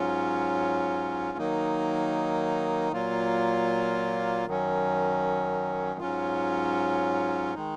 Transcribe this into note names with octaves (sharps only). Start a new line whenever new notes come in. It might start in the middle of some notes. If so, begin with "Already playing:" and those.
Already playing: G#2 F#3 C#4 F4
D#3 F#3 A#3 D#4
A#2 F#3 A#3 F4
F#2 D#3 F#3 C#4
G#2 F#3 C#4 F4
D#3 G#3 D#4